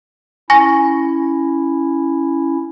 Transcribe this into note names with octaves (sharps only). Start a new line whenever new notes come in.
C#4 E4 G#5 C#6 A#6